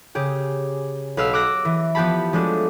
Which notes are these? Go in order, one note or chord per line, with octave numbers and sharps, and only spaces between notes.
C#3 G4 G#4
B1 B4 F5 E6 F6 B6
D6 E6 F#6 A#6
E3
F3 B3 G4 A5 B5
F3 F#3 G#3 A3 D4